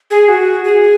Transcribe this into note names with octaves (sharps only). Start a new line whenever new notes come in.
G#4
F#4
G#4